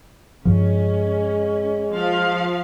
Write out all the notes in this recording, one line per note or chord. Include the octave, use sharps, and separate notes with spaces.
G2 F3 G#3 C#4
F3 F5